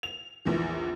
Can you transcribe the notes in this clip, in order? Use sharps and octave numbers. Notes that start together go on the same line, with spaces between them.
F7
A#1 E2 E3